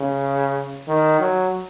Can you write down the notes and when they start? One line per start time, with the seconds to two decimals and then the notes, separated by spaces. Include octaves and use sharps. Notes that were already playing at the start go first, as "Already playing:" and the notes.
Already playing: C#3
0.88 D#3
1.20 F#3